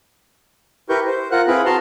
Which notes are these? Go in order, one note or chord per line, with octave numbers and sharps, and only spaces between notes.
E4 G4 A#4 B4 C#6 G6
C5
F4 A#4 F#5 F#6
C4 E4 G#4 B4 F5 B5
F#4 A5 A#5 C6